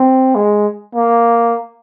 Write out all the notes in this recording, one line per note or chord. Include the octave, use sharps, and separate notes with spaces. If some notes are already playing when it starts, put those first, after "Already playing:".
Already playing: C4
G#3
A#3